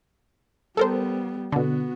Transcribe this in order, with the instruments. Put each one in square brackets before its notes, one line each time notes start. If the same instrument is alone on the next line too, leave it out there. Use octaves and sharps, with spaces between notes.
[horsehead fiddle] G3 B3 [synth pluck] A4 A#4 C5
[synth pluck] B2 D3 [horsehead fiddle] B3 F#4